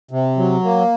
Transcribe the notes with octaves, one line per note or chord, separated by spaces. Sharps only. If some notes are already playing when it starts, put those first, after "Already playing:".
C3
F#3
A#3